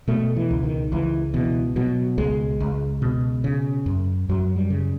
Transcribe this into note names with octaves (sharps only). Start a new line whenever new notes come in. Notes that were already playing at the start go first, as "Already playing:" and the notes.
B2 A3
E3
C#2
D#3
C#2 E3
B2 E3
B2 F#3
C#2 G#3
C#2
B2
C#3
F#2
F#2 F#3
G3
C#3